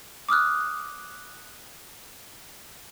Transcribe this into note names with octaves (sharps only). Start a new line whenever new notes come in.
D6 D#6 F6 F#6